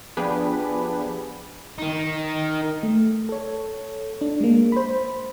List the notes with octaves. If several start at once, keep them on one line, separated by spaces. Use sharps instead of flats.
F3 B3 D4 G4 G#4 B4
D#3 D#4
A3
A4 C#5
D4
G#3 A#3
C5 B5